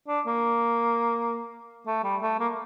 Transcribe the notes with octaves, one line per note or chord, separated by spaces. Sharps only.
D4
A#3
A3
G3
A3
A#3